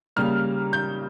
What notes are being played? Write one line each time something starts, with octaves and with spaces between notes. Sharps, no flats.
C#3 G3 A#3 F6
G6